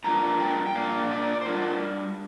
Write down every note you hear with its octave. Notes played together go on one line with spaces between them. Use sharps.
G2 F3 A#3 D4 A#5
G5
G5
A#2 A#3 D4 F5
D5
C5
G3 D4 F4 A#4